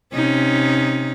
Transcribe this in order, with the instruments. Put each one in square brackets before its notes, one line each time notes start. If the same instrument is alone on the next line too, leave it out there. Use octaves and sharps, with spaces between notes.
[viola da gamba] C3 C#4 D#4